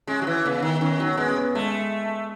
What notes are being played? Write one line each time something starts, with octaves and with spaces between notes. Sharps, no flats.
G#3 C#4
F#3
E3
C#3 B3
D#3
D#3 C#4
F#3
G#3 B3
C#4
B3
G#3 A3